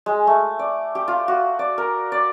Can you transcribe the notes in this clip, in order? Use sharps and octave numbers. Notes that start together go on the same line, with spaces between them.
G#3
A3
D5
G4
F4
F#4
D5
A#4
D5